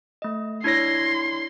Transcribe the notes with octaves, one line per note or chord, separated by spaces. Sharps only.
A3 D#5
D4 E4 C#5 C6 G#6 A#6